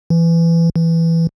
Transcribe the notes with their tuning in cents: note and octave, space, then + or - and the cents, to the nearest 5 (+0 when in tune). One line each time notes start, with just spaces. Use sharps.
E3 +20
E3 +5